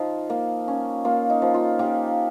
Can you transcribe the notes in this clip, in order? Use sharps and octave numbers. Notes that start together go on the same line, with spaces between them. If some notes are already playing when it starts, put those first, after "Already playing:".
Already playing: F3 D#4 F4
A#3
C#4
A#3 F4
D#4
F3
F4
A#3 D#4 G4